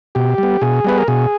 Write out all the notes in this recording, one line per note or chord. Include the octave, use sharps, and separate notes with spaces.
B2 G4
G3 B3
B2 G#4
G3 B3 B4
A#4
B2 G#4